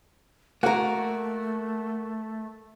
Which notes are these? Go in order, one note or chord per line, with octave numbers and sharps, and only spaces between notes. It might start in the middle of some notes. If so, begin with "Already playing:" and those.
A3 A#3 F#4 A#4